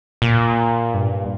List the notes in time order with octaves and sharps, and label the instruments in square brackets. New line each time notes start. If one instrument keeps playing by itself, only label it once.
[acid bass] A#2
G2